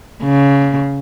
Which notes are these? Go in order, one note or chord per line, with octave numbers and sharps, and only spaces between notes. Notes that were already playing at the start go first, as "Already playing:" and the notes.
C#3